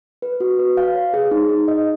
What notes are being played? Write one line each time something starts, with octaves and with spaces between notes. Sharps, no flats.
B4
F#4
B4
F5
C#5
G#4
D#4
D#4
D#5